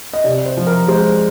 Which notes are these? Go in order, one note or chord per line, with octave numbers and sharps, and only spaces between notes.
D#5
C3 D5
C5
F3
A#4
G#3 C5